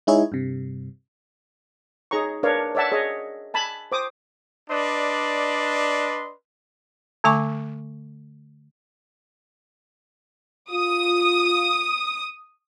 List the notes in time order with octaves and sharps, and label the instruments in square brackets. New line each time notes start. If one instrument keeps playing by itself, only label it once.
[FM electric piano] G#3 D#4 E4 G#4 C#5
G2 C3
[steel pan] D#4 G#4 C#5 A#5 C#6
D4 A#4 B4 C#5 D5 F5
C#5 D5 E5 F#5 A5
G#4 C#5 D#5
G#5 A5 B5
C5 D6 D#6
[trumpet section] D4 B4 D5 D#5 C6
[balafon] D3 A3 G#5 C#6 D6
[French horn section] F4 [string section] D#6